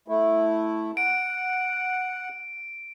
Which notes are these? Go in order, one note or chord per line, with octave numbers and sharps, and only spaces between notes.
A3 E4
F#5 D7